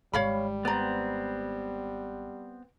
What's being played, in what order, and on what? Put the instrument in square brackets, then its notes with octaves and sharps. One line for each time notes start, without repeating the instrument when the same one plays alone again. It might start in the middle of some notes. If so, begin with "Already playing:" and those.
[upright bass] G#1 [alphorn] G3 [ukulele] C#5 F5 B5
[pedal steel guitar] B3 C4 [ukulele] D5 A#5